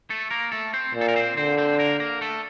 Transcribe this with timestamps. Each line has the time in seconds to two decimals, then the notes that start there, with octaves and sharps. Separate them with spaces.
0.10 A3 A4
0.30 A#3 A#4
0.52 A3 A4
0.73 C4 C5
0.94 A#2
1.01 A4
1.08 A#4
1.16 C4 C5
1.37 D3 C4 C5
1.58 C4 C5
1.78 A#3 A#4
2.00 A#3 A#4
2.21 A3 A4